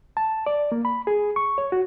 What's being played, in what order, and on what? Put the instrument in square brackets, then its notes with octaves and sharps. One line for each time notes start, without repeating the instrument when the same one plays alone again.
[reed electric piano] A5
D5
A#3
B5
G#4
C#6
C#5
F#4